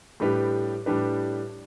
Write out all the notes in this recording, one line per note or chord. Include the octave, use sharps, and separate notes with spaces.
A2 G3 D4 G4 B4
A2 G3 D4 G4 B4